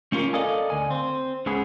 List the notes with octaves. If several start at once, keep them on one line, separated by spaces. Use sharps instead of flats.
A3 C#4 F4 G4 A#4
A4 A#4 D5 D#5 F5 G#5
D2 G#5
C4
C#2 C#3 B3 G#4